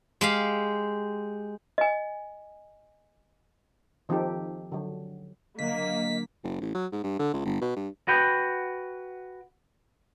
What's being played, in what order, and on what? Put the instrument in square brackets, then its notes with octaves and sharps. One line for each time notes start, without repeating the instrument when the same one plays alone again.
[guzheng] G#3 G4 F5
[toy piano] D#5 G#5
[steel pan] D#3 F3 C4 D#4 G4 A4
D3 F#3
[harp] D3 F#3 [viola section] A#3 [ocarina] D#5 [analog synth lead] B6
[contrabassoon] F#1
A1
F#3
G#2
G2
D3
C#2
G1
B2
G2
[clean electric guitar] F#4 B4 G5